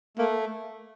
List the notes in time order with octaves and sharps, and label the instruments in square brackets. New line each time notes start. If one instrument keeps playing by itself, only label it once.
[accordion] A3 [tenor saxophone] A#3